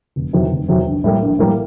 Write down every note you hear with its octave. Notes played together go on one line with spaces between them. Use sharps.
F1
E2 C3 D#3 F#3
F1
E2 C3 D#3 F#3
A#1
A2 E3 G3 A#3
A#1
A2 E3 G3 A#3